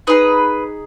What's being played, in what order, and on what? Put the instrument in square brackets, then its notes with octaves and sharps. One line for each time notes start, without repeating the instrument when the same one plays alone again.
[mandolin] D#4 G#4 B4